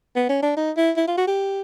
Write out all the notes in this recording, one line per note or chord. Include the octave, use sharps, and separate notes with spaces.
B3
C#4
D4
D#4
E4
E4
F4
F#4
G4